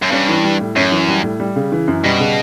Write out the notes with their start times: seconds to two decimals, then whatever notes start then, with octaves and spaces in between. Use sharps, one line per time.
0.02 F#2
0.12 G2 C#4
0.29 E3
0.44 G3
0.61 A2
0.76 F#2 C#4
0.92 E3
1.08 G3
1.23 A2
1.40 G3
1.56 C#3
1.72 E3
1.88 F#2
2.04 B2 G3
2.20 C#3